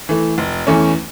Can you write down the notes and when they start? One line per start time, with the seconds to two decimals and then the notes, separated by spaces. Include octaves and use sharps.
0.09 E3 A3
0.38 F1
0.67 E2 E3 A3 C#4